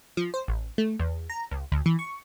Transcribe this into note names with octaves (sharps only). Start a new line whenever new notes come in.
F3
C5
A1
A3
E2
A#5
C#2
D2
E3
C#6